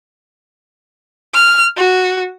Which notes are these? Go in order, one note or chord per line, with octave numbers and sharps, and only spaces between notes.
F6
F#4